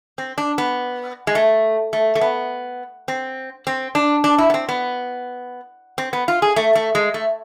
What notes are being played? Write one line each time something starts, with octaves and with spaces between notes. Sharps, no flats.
C4
D4
B3
G#3
A3
A3
A3
B3
C4
C4
D4
D4
E4
B3
C4
B3
C4
B3
F4
G#4
A3
A3
G#3
A3